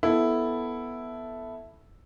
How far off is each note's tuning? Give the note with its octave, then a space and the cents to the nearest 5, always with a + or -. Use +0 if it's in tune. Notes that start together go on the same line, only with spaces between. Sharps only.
B3 +0 E4 +0 A4 +0